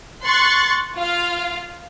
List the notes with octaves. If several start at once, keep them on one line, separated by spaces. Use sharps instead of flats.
C6 C#6 F#6 A6 C#7
F4 F5